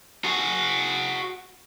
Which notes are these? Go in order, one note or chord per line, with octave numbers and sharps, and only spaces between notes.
F#4 G#4